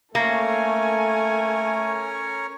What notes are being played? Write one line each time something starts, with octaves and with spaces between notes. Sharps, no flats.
A3 A#3 C#4 A4 A#4 C#5 G#5